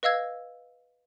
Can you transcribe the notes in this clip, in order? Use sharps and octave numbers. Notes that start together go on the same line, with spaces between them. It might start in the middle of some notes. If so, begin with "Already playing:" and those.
B4 D#5 F5 E6 G#6